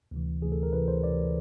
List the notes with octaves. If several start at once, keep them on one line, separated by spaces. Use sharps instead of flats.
D2 C3 E3
D2 C3 E3 G#4
A4
A#4
D2 C3 E3 B4
C5
D2 C3 E3 D5